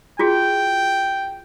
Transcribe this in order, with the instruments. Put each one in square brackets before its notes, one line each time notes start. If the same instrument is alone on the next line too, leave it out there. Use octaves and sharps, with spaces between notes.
[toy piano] F4 F#4 G#4 [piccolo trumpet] G5